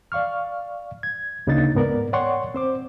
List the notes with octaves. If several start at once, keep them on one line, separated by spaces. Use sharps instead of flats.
D5 F5 C#6 F6
G#6
D2 C#3 A#3 D4 D#4 A6
G#2 B3 A#4 D5
C#5 D5 F#5 G5 C6 C#6
C4 C5 D6